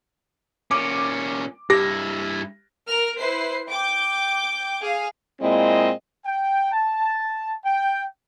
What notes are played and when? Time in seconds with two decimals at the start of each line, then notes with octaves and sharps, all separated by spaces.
0.71 A#2 C#4 D6
1.70 G2 E4 G4 A#6
2.85 A#4 F6
3.17 E4 B4 C5 C7
3.69 G5 D6 G6
4.81 G#4 F5
5.41 A#2 G#3 C4 E4 D#5
6.26 G5
6.73 A5
7.65 G5